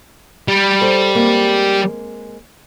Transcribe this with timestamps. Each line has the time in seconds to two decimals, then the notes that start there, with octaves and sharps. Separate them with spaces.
0.48 G3
0.81 A4 C5
1.15 G#3 A#3 C4